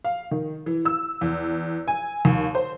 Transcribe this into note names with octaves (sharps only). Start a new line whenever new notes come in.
F5
D#3
E3
E6
E2
G#5
D#2
C5